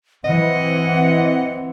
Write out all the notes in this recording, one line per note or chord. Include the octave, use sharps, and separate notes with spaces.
E3 C4 D#5 F#5